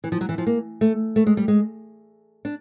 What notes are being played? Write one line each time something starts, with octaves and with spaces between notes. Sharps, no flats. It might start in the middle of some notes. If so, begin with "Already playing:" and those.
E3
F3
F#3
E3
F3
A#3
A3
A3
G#3
G3
G#3
D4